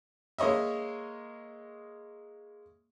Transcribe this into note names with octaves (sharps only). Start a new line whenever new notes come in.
G#3 A#3 C#5 D#5 E5